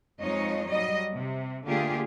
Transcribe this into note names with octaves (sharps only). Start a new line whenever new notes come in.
F2 F3 G#3 D#4 C#5 D#5
F#3 G3 D#5
C3
D3 A3 A#3 F4 G4 G#4